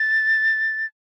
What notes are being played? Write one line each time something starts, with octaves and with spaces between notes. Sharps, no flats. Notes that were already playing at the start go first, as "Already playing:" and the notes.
Already playing: A6